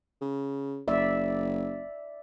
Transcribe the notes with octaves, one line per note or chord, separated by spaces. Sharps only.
C#3
F#1 D5 E5